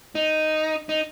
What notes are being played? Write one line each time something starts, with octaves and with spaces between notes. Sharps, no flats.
D#4
D#4